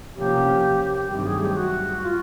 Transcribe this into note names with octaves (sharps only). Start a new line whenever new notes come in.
C3 F3 A#3 C#4 G4
G2 D#3 F#3 A3 C4 G4
G#4
G4
F#4
F4